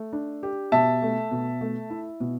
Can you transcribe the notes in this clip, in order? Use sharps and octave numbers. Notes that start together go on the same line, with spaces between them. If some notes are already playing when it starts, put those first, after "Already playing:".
Already playing: A3
D4
G4
B2 E5 A5
A3
B2
A3
E4
B2